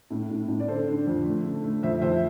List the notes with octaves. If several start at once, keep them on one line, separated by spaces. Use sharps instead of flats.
A2
A2
A2
D5
D3 A4 C5
D4
F2
A3
D3
A3
F2 C5 E5
F2 C5 E5